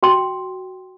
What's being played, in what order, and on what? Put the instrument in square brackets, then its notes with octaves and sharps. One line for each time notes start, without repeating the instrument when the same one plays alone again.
[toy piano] F#4 G5 C6